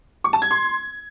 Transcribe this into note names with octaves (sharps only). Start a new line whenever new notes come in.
C#6
A5
G#6
C6